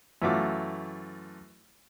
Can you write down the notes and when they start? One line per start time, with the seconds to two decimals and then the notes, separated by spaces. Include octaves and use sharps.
0.22 F#2 E3 A3 F4 D6